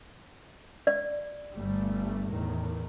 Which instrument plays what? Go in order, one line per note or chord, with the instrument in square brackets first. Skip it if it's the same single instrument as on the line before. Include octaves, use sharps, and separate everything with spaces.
[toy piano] D5
[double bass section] G1 G3 A3
E2 A2 D#3